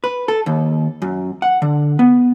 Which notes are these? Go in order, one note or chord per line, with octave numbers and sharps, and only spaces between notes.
B4
A4
D#2
F#2
F#5
D3
B3